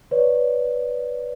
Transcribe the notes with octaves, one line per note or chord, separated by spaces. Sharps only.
B4 C#5 D5